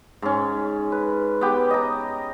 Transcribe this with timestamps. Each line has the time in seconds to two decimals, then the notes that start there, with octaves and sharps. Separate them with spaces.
0.22 G#2 C#4
0.92 B4
1.41 B3 G4
1.71 D#5 A#5